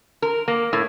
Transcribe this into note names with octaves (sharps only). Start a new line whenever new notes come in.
A#4
A#3
A2